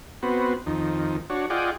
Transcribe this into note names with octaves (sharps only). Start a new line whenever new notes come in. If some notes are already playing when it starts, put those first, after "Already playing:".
B3 C4 F#4
F2 D#3
D4 F#4 C#5
F4 G#4 D5 D#5 F#5 G5